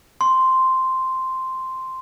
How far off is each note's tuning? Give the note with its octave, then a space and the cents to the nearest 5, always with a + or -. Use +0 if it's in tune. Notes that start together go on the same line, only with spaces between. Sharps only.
C6 -5